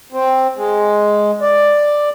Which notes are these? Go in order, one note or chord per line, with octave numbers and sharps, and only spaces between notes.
C4
G#3
D5